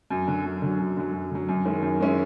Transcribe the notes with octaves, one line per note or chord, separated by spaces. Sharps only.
F#2
D3 F#3
F#2
D3 F#3
F#2
D3 F#3
F#2
D3 F#3
F#2
D#3 G#3 C#4 E4
F#2
D#3 G#3 C#4 E4